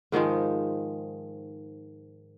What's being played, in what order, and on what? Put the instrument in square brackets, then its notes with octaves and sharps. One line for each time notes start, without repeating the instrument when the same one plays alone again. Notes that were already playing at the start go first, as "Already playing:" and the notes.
[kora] G#2 D#3 F3 G#3